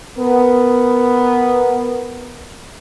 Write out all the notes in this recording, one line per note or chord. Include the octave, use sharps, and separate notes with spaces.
B3 A#4